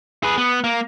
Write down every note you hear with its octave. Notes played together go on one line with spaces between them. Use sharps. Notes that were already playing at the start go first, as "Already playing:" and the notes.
G#4 B4
B3
A#3